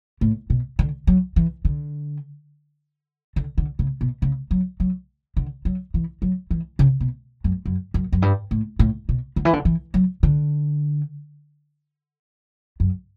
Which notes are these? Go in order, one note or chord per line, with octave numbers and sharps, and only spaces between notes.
A2
B2
D3
F#3
E3
D3
D3
D3
C#3
B2
C#3
F#3
F#3
D3
F#3
E3
F#3
E3
C#3
B2
F#2
F#2
F#2
F#2
G2
A2
A2
B2
D3
E3
D3
E3
F#3
D3
F#2